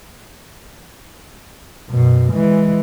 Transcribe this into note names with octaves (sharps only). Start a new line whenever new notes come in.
F#2 B2
E3 G#3